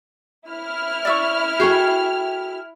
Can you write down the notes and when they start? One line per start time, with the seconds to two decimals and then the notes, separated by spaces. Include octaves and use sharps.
0.48 E4 F6
1.05 D5 E5 C#6
1.60 F#4 G#4 A4 G5 C#6